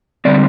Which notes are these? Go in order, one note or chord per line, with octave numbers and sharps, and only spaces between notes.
D3 G3 C4 D5